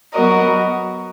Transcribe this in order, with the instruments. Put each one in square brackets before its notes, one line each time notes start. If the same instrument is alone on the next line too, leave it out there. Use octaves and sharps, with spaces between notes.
[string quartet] F#3 B3 F#4 A#4 D#5